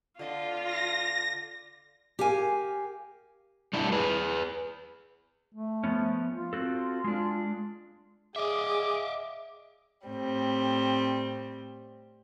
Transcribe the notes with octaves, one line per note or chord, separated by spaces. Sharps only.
D3 F4 D#5
A#6
G4 A#4 F5 G#5
G3 A3 D4 E4
G#4 B4
A3
F3 B3 C#4
F4
C4 F#4 A4
G#3 D4
G#4 D#5 E5 D6
A2 G3 C4